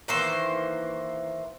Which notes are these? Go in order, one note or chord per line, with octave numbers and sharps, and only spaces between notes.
D#3 E3 A#3 C5